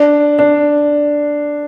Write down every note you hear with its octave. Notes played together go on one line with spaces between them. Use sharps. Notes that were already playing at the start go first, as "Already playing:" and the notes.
Already playing: D4
D4